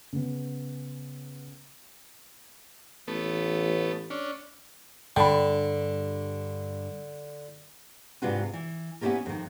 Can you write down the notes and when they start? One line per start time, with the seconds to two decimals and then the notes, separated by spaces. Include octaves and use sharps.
0.13 C#3 B3
3.08 A1 A3 B3
4.10 C#4 D4
5.16 G2 D3 D4 G5 A5 B5
8.22 G#2 C3 D4 F4 F#4 B4
8.54 E3
9.01 B3 C#4 E4 F4 G4 A#4
9.26 F2 D#3